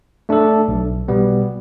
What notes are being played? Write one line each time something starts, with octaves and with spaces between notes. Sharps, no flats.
A3 D4 A4
B1
B2 G3 B3